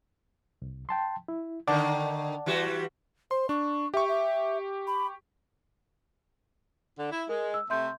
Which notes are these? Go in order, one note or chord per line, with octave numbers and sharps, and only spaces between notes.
C2
G5 A5 C6
E4
D3 D#3 D5 F#5 A5
E3 G3 F#4
C5 C6
D4 C#6
G4 E5 C#6
E5
B5
D3
E4
G#3 A#4
E6
C3 A3 E5 C6 G6